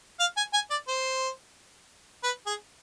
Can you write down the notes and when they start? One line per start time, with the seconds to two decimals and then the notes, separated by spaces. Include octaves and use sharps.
0.20 F5
0.37 G#5
0.53 G#5
0.71 D5
0.88 C5
2.24 B4
2.46 G#4